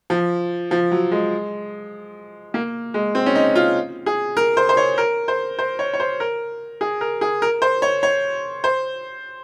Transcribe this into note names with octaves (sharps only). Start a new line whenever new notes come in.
F3
F3
F#3
G#3
A#3
G#3
C4
C#4
D#4
F4
G#4
A#4
C5
C5
C#5
A#4
C5
C5
C#5
C#5
C5
A#4
G#4
A#4
G#4
A#4
C5
C#5
C#5
C5